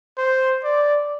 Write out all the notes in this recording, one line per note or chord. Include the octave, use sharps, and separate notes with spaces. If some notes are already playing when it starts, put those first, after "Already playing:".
C5
D5